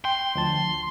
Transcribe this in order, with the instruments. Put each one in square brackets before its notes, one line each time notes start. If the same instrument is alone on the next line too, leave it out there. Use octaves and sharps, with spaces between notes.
[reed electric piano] G5 [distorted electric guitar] C6
[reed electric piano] D2 F3 A5